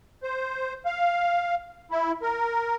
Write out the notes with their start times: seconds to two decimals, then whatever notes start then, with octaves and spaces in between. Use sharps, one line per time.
0.23 C5
0.86 F5
1.91 E4
2.22 A#4